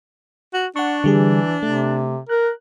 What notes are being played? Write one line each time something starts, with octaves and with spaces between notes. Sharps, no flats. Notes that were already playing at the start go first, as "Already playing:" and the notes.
F#4
D4 F#5 C#6
D3 E3 G3 G#4
C3 A3
A#4 F#6